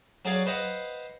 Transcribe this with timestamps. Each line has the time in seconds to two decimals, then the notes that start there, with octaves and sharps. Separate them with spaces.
0.25 F#3 C#4 G#4 D5 F5 G#5
0.46 B4 C5 D#5 F5 F#5